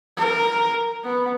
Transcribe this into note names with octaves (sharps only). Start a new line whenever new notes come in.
A#4
B3